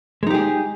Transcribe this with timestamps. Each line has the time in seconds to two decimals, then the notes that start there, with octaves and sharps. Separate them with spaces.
0.23 G#3
0.27 D#4
0.30 G4
0.34 G#4